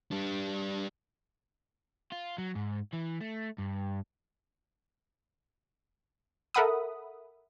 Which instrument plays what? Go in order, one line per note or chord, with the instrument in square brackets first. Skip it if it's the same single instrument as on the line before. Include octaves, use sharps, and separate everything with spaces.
[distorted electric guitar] G3 D4
[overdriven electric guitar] F4
F#3
G#2
E3
A3
G2
[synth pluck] A4 A#4 E5 F#5 B5 D#6